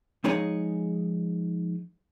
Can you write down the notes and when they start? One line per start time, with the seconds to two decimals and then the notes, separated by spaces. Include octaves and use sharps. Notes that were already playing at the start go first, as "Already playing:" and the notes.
0.24 F3 G#3 D#4 G#4 C#5 D#5